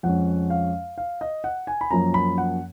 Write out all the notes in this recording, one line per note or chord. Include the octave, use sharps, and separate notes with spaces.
F2 F3 G#3 C#4 F#5
F5
F5
D#5
F#5
G#5
B5
F#2 F3 A#3 C#4 A#5
B5
F#5